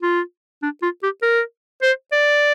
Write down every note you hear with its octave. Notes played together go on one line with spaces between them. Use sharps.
F4
D4
F4
G4
A#4
C5
D5